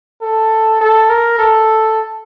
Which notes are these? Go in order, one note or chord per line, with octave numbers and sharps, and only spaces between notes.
A4
A4
A#4
A4